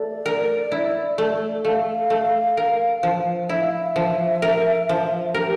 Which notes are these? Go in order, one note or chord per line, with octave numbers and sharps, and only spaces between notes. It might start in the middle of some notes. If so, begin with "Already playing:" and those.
Already playing: A3 D5
A#4
E4
A3
A3 F5
A3
A#4
F3
E4 E5
F5
E5
F3
A#4
F3
G4 A#4